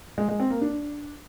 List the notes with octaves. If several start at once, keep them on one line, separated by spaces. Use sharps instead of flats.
G#3
G#3
C4
A#3
D4